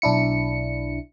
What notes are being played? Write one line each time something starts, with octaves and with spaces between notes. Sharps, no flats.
B1 D4 E4 C#7